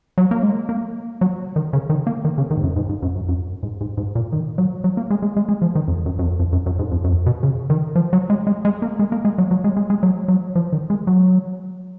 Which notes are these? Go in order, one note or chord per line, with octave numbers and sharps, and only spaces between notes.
F#3
A#3
G#3
A#3
F#3
D#3
C#3
D#3
A#3
D#3
C#3
D#3
G#2
F#2
G#2
G#2
F#2
F#2
F#2
G#2
G#2
G#2
A#2
D#3
F#3
F#3
A#3
G#3
G#3
G#3
G#3
F3
D#3
F2
F#2
F#2
F2
F2
F#2
F#2
G#2
F2
F#2
F2
B2
C#3
D#3
F3
F#3
G#3
G#3
G#3
A#3
G#3
A#3
G#3
F#3
F#3
G#3
G#3
G#3
F#3
F#3
F3
D#3
G#3
F#3